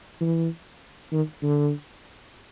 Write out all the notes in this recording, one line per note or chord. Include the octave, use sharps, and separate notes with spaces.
E3
D#3
D3